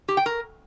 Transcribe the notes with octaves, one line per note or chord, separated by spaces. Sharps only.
G4
G5
A#4